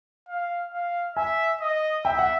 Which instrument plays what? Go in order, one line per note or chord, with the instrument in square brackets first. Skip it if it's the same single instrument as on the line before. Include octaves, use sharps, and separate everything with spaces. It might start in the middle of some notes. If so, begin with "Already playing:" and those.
[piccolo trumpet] F5
F5
[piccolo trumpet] E5 [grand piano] G#5
[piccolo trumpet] D#5
[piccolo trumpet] E5 [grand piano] G5
[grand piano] F#5